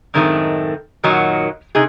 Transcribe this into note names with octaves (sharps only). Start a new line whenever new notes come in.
F#2 A2 D#3 G#3 A3 C4
F#2 A#2 D#3 F#3 D#4 F#4
C3 D#4 G#4